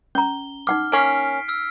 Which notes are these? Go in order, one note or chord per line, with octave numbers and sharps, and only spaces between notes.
C#4 A#5 G7
D#4 F#5 D6 F6
A#3 C#4 B6 C7 D7
E6 F6